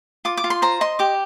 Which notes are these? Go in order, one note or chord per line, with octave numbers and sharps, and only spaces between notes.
F4 D6
D6
F4
C6
C5 A#5
D#5 C6
G4 D6